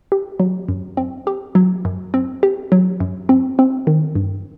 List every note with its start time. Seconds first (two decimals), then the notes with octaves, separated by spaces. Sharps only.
0.12 G4
0.40 F#3
0.69 F#2
0.97 C4
1.27 G4
1.55 F#3
1.85 F#2
2.14 C4
2.43 G4
2.72 F#3
3.00 F#2
3.29 C4
3.59 C4
3.87 D#3
4.15 G2